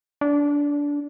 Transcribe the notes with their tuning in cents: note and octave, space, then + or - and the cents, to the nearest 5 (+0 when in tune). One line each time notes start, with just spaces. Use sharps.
D4 -20